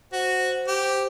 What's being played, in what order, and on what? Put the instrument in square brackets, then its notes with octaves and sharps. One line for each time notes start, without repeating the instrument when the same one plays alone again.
[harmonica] F#4 [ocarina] C5
[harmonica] G4